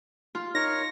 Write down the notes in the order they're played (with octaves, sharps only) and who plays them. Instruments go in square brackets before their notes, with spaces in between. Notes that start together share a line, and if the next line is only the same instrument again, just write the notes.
[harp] F4
[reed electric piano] D#4 [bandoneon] A#4 C#5 [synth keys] A#6